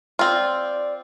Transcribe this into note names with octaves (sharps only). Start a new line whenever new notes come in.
C4 F4 D5